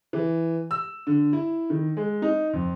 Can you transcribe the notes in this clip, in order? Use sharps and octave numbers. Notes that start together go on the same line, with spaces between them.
E3
E6
D3
E4
D#3
G#3
D#4
F2